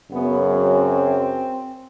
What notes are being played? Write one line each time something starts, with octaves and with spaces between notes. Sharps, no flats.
F#2 C#3 F#3 B3
C4